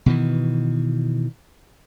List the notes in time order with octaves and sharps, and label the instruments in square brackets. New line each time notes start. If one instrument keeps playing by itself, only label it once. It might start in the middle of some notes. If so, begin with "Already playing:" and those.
[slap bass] B2 D#3 E3